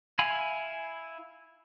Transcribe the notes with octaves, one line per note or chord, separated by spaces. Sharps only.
E4 F5 G#5 B5